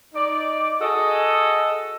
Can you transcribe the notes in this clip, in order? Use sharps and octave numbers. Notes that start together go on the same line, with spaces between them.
D#4 D5
F#4 G#4 A4 D#5